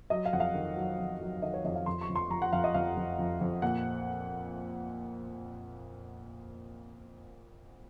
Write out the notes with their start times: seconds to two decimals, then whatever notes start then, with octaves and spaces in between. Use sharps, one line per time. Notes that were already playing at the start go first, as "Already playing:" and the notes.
0.10 F#3 D#5
0.26 F5
0.33 F2 F#5
0.40 F5
0.54 D#3
0.77 F#3
0.99 F2
1.21 F#3
1.42 D#3 D#5
1.54 C#5
1.64 F2 D#5
1.76 F5
1.86 F2 C6
2.01 C#6
2.09 F2
2.15 C6
2.30 F3 A#5
2.42 F#5
2.53 F2 F5
2.64 D#5
2.74 F2 F5
2.97 F2
3.19 F2
3.41 F2
3.62 A#2 F#5